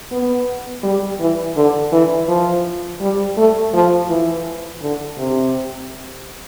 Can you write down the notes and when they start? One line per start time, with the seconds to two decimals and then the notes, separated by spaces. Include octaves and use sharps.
0.12 B3
0.83 G3
1.20 E3
1.57 D3
1.92 E3
2.28 F3
3.01 G3
3.37 A3
3.74 F3
4.09 E3
4.82 D3
5.18 C3